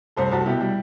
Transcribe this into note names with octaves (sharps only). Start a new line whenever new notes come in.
C2 A4 C5
C2 F#4 A4
B2 E4 G4
G3